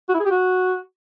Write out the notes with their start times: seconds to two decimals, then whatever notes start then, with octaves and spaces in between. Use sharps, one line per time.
0.09 F#4
0.14 E4
0.20 G#4
0.25 G4
0.31 F#4